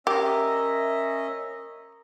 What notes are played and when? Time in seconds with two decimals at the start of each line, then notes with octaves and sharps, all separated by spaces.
0.07 C#4 G4 A#4 D#5 E5